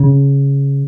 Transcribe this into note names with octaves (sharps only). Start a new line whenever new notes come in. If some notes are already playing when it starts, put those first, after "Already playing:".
Already playing: C#3